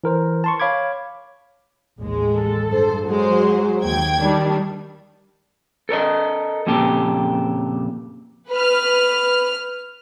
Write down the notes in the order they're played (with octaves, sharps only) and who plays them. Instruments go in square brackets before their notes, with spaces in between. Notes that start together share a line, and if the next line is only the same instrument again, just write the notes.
[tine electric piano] E3 A#4 C5
A5 C6 C#6
C#5 F5 B5 D6 G#6
[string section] A1 D#2 G#3
[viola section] A4
[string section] G2 C5
[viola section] F#3 [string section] G#3 C5
[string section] D#2 G5 G#6
[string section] D#3 D4 [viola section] G3
[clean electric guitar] A4 A#4 C#5 D#5
F2 A#2 C#3 G4 A4
[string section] B4 F6